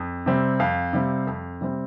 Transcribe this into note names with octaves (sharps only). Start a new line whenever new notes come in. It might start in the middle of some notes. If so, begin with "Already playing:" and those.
Already playing: F2
C3 G3 C4
F2 F5
C3 G3 C4
F2
C3 G3 C4